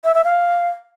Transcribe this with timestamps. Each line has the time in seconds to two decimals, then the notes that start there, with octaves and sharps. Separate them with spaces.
0.04 E5
0.15 E5
0.25 F5